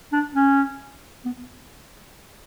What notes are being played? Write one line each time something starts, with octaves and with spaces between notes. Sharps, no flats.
D4
C#4
B3